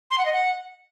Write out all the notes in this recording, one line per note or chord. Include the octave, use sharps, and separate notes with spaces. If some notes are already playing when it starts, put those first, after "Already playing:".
C6
F#5
D#5
F#5